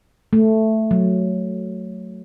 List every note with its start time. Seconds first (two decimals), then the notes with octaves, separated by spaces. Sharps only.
0.33 A3
0.91 F#3